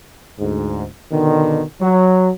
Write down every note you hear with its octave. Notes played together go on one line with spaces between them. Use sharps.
D2 G#2
B2 D3 D#3
F#3